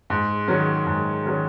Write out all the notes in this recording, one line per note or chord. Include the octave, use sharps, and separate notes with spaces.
G#2
D#3 F#3 C#4
G#2
D#3 F#3 C#4